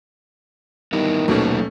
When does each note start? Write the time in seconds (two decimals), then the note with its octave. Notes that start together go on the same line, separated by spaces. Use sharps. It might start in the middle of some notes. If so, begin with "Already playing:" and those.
0.93 D#3 G3 B3 D#4 E4
1.28 D#1 B2 F#3 A3 A#3 C#4 D#4